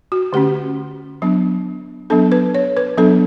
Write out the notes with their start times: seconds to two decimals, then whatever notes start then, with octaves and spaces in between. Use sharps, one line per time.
0.12 F#4
0.33 D3 A3 C#4 G4
1.22 F#3 B3 D4
2.10 F#3 B3 D4 A4
2.32 B4
2.55 C#5
2.77 B4
2.97 F#3 B3 D4 A4